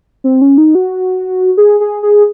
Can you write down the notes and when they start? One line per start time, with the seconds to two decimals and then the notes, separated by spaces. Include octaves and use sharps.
0.24 C4
0.42 C#4
0.58 D#4
0.75 F#4
1.57 G#4
1.80 G#4
2.03 G#4